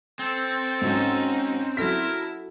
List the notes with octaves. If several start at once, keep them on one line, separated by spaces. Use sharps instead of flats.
C4 A4
G#2 F#3 C#4 D#4
F#3 E4 A4 A#4 B6